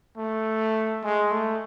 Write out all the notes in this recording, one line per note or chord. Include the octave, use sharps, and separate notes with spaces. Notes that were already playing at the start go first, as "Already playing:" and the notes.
A3
G#3
A3